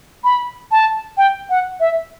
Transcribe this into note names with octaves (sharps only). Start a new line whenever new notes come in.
B5
A5
G5
F#5
E5